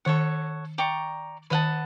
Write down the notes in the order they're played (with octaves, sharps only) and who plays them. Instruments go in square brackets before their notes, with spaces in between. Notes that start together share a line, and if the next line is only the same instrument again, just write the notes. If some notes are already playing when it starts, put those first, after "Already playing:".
[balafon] D#3 [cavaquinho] A4 C#5 F#5
[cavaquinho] D5 G5 A#5 C#6
[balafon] D#3 [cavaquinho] B4 D#5 F#5 A5